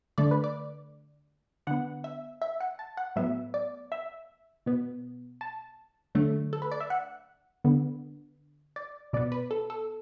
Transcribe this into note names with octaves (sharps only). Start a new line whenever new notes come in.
D3 A3 D5
B4
D5
D3 B3 F#5
E5
E5
F#5
A5
F#5
A2 F#3 B3 E5
D5
E5
B2 B3
A5
D3 F#3 A3
A4
B4
D5
E5
F#5
D3 B3
D5
B2 B3 D5
B4
A4
A4